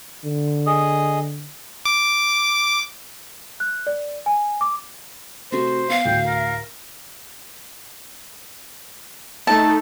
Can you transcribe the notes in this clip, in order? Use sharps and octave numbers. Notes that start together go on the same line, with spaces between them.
D3
G#4 D#5 D#6
D6
F#6
D5
G#5
D6
C3 A3 F#4 C5
B3 F5
D2 A2 G5
A#4
A3 D#4 A4 A5